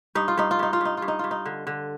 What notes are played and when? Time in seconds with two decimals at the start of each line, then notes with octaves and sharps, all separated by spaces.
0.15 G2 D#4
0.28 F4
0.37 G2 D#4
0.51 F4
0.59 G2 D#4
0.73 F4
0.81 G2 D#4
0.97 G2 F4
1.08 D#4
1.19 G2 F4
1.31 D#4
1.46 D3
1.67 D3